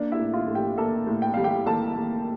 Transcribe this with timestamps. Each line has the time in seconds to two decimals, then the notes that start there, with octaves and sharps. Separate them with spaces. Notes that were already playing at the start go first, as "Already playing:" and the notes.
Already playing: A#3 D4 D5
0.12 E4 E5
0.19 A2
0.34 F4 F5
0.48 A2
0.55 G4 G5
0.78 A#3 A4 A5
1.07 A2
1.22 G5
1.34 G3 F5
1.44 G4 G5
1.66 A#3 A4 A5
1.95 A#3